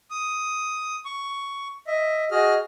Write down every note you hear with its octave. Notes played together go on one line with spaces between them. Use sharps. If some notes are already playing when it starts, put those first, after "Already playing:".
D#6
C#6
D#5 E5
F#4 G#4 D#5 F6